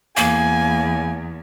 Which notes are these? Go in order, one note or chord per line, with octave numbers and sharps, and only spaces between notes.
E2 A#3 G#5